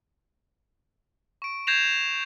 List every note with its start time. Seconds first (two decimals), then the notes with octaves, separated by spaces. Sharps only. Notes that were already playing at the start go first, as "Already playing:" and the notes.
1.42 C#6 D7
1.67 G6 G#6 A#6 C7 E7 F7